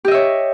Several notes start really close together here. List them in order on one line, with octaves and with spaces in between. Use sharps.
G4 D#5 E5 C#5